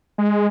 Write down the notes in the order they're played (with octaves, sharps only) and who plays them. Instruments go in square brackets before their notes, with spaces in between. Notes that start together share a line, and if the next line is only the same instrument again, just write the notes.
[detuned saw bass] G#3